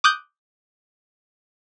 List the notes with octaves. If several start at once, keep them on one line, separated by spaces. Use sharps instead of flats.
D6 D#6 F#6 G6